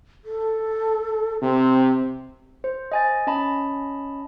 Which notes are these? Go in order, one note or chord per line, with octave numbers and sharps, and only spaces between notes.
A4
C3 C4
C5
D#5 G#5 A6
C#4 D#5 A5 B5